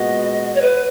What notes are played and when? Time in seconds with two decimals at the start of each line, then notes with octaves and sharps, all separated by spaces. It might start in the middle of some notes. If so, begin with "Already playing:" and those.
Already playing: A#2 G#3 B3 F#4 D#5
0.55 C#5
0.61 B4